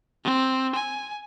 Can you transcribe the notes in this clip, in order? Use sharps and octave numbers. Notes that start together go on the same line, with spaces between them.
C4
G#5